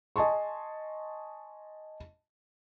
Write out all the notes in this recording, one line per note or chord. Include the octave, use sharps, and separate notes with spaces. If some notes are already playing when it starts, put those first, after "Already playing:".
D#5 G#5 A5 C6 C#6